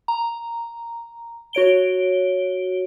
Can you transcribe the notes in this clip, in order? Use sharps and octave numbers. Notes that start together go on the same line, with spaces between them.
A#5
F#4 C#5 D7 G7